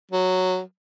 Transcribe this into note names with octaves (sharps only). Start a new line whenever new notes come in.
F#3